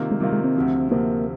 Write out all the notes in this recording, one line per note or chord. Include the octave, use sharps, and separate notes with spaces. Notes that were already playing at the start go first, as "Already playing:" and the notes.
Already playing: C3 D#3 A#3 F4
G#3
C3 D#3 G3 A#3 F4
G#3
C4
D2 C3 F3
D2 C3 F3 A#3